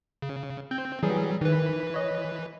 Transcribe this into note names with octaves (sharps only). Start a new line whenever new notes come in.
C#3
C4 G6
E3 F#3 G3 G#4
D#3 E3 B4
C#5 D#5